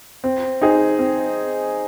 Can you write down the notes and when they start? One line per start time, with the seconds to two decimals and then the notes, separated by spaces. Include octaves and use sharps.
0.24 C4
0.62 D#4 G#4 C5
0.99 C4